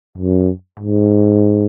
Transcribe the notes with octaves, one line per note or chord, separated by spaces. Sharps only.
F#2
G#2